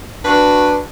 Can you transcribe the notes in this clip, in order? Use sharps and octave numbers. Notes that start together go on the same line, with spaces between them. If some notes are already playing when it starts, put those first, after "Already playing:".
D4 F#4 B4